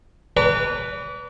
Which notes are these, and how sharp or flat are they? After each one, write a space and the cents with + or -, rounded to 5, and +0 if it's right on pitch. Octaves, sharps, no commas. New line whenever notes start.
B4 +0 D5 -40 A#5 -35